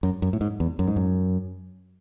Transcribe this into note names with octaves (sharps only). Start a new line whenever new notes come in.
F#2
F#2
A2
G#2
E2
F#2
G#2
F#2